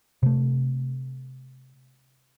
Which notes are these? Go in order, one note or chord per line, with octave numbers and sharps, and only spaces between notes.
C3 A3